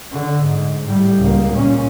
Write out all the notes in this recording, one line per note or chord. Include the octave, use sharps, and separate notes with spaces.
D3
G#2
A2 G3
C#2 A#3
A#2 C#4